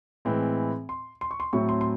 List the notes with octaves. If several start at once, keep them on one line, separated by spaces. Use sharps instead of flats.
A2 E3 G#3 C4
C6
C6
C#6
C6
A2 F#3 A3 C4 C#6
C6
C6